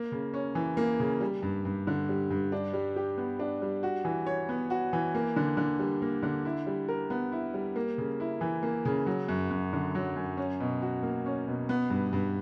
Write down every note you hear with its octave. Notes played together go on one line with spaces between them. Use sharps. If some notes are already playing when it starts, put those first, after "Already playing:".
Already playing: A#3
C#3
C#4
E3
A#3
C#3
G3
G2
G2
D3
G3
G2
D4
G3
G4
B3
D4
G3
F#4
E3
C#5
B3
F#4
E3
A#3
D3
D3
G3
A#3
D3
E4
G3
A#4
B3
E4
G3
A#3
C#3
E4
E3
A#3
C#3
F#3
F#2
F#2
D3
F#3
F#2
C#4
B2
F#4
A#3
C#4
B2
B3
G2
G2